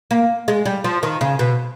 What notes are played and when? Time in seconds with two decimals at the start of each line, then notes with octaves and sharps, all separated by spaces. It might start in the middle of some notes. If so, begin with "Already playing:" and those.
0.11 A#3
0.48 G#3
0.65 G3
0.84 F3
1.03 D#3
1.21 C#3
1.39 B2